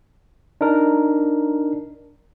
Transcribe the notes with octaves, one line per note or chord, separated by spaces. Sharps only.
D4 D#4 A#4